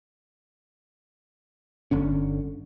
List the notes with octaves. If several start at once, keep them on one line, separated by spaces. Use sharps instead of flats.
G1 D3 C#4